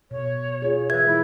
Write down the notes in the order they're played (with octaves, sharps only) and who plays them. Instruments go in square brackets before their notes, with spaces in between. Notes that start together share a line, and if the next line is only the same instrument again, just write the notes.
[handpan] B2 [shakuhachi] C#5
[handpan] F4 G#4
[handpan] E3 E5 [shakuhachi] B4 [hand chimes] G#6
[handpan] G#3 [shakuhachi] E4